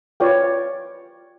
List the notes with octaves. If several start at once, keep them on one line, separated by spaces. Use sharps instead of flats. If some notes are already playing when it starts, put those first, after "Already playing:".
F4 B4 C#5 D5 F5 G5